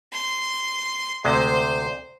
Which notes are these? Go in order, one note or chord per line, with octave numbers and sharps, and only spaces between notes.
C6
D2 C3 G#3 C5